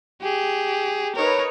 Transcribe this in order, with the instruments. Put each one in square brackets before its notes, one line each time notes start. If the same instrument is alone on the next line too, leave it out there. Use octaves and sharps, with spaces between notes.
[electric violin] G4 G#4
[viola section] D#4 B4 C#5 [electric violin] A#4